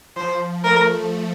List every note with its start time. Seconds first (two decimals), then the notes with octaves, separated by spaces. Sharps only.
0.16 F3 C5
0.64 A3 A#4